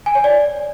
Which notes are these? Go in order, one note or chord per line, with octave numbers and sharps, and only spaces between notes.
G#5
C#5
D5